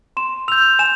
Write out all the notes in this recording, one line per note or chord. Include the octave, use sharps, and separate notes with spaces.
C6 E7
E6 G6 F7
G#5 E7